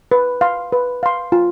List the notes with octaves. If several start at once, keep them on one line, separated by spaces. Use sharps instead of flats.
B4
F5 C6
B4
F5 C6
F4